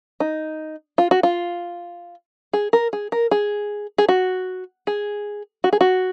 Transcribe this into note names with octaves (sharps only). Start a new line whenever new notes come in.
D#4
F4
F#4
F4
G#4
A#4
G#4
A#4
G#4
G#4
F#4
G#4
F#4
G#4
F#4